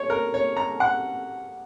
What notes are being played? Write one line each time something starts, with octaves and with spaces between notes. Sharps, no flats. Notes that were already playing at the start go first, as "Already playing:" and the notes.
Already playing: C#5
A#4
C#5
A#5
F#5